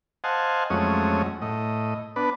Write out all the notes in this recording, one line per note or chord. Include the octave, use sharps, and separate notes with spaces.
C5 D#5 F5 F#5 G#5 A5
F2 F#3 G#3 A3 C#4 D#6
A2 D#5
B3 D4 B4